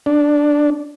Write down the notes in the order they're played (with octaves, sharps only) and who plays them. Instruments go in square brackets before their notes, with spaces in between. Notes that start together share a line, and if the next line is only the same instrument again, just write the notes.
[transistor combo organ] D4